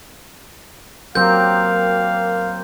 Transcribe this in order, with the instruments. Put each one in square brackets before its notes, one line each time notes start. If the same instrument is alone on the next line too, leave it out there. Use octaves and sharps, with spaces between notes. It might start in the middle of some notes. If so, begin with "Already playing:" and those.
[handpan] F#3 A#4 [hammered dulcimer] A#3 C4 G4 [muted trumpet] F5 [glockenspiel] G6